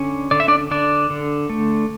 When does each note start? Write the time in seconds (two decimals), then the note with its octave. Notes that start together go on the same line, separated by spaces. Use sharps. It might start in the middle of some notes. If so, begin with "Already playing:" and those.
Already playing: D3 C#4
0.31 D3 D5
0.40 E5
0.48 D4 D5
0.71 D3 D4 D5
1.10 D3
1.50 A3